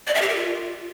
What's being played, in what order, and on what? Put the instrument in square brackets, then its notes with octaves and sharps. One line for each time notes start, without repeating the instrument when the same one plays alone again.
[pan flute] D5
E5
G4
A#4
F4